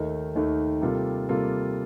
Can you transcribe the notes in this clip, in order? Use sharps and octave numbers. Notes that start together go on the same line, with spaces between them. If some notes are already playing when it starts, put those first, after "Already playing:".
Already playing: D#2 D#3 A3 D#4
D#2 D#3 A3 D#4
C3 G3 A#3 F4 A4
C3 G3 A#3 F4 A4